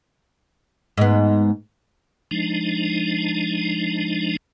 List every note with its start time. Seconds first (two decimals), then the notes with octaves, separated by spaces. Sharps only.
0.97 G#2 B3
2.31 F3 G#3 D4 D#4